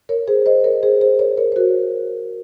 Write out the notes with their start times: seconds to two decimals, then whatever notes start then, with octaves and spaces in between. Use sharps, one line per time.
0.09 A#4 C#5
0.28 G#4 C5
0.46 C5 D#5
0.64 A#4 C#5
0.83 G#4 C5
1.01 G#4 C5
1.19 A#4 C#5
1.37 A#4 C#5
1.52 C5
1.56 F#4 A#4